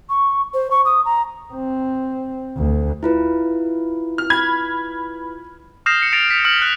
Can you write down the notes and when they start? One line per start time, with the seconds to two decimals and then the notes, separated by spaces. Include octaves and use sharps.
0.09 C#6
0.53 C5
0.70 C#6
0.85 D#6
1.05 A#5
1.53 C4
2.57 D2
3.03 E4 F4 B4
4.18 F6
4.30 B5 G#6
5.86 D#6 F6 G6 A#6 C7 E7
6.01 C7 C#7 E7
6.12 A6 A#6 C7 D7 F7
6.30 B6
6.45 F6 C#7 F#7
6.62 F#6